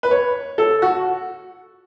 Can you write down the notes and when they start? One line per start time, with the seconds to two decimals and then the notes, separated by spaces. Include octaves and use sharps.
0.03 B4
0.11 C#5
0.58 A4
0.82 F#4